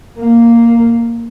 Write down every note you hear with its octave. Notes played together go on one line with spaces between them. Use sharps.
A#3